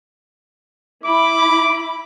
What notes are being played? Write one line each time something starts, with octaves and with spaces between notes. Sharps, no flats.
E4 B5 D6